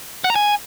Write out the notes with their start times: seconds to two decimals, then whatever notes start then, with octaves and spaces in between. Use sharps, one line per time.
0.24 F#5
0.30 A#5
0.35 G#5